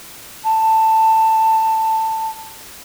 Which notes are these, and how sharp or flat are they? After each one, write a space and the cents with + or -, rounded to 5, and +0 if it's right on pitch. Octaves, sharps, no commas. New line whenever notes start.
A5 +10